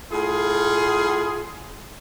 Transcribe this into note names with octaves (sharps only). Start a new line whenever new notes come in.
A2 F4 G#4